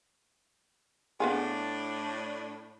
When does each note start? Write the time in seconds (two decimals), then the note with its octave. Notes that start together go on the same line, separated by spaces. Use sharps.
1.20 A2 B3 D4 F4 G#4